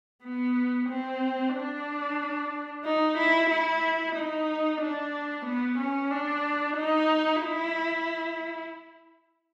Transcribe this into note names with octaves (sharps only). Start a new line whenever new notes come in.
B3
C4
D4
D#4
E4
E4
D#4
D4
B3
C#4
D4
D#4
E4